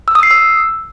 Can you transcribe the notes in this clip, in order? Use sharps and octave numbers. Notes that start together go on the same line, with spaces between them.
E6
D#6
C7
E6